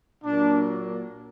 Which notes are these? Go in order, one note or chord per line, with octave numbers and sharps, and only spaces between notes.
A#2 F#3 A#3 D4